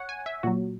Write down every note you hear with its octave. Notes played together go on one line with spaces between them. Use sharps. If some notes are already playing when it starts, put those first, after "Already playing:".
Already playing: C#5 F#5
G#5
E5
A#2 F#3 F#4